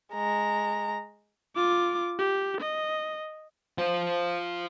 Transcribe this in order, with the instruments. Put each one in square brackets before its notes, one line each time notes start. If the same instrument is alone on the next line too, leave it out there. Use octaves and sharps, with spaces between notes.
[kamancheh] G#3 A#5
[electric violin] F4 D6
G4
D#5
[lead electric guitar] F4 C5